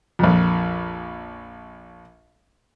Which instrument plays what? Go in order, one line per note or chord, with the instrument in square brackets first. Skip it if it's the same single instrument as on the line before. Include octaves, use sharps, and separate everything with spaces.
[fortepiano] A#1 F2